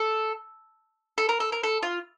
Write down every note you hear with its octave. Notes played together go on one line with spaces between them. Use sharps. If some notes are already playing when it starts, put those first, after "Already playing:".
Already playing: A4
A4
A#4
A4
A#4
A4
F4